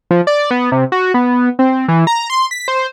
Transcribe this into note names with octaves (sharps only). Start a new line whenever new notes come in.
F3
D5
B3
C3
F#4
B3
C4
E3
A#5
C6
B6
C5